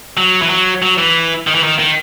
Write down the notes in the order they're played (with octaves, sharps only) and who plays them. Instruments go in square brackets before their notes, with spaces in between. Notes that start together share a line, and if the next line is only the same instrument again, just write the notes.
[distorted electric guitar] F#3
E3
F#3
F#3
E3
D#3
E3
D#3
D#3